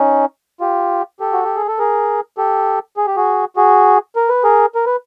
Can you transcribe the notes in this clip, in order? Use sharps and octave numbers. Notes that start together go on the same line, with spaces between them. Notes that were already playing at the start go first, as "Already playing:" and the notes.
Already playing: C#4 D#4
F4 G4
G4 A4
F#4
G4
G#4
A4
G#4 A#4
G4 A4
G#4
G4
F#4 G#4
F#4 G#4
A#4
B4
G#4 A#4
A#4
B4